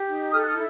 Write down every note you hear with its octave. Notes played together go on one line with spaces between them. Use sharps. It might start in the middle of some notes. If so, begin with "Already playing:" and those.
Already playing: G4
D#4
A4 D#6 F6
F#6
D#6 F6
E4